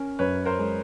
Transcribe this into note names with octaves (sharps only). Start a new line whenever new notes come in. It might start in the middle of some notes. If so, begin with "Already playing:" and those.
Already playing: C#4 A#4
F#2 B4 C#5
A#4 C5
G#3